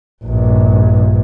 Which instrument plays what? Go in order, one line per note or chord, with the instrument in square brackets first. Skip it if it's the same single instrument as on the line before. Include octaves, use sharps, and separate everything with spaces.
[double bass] A#1 G2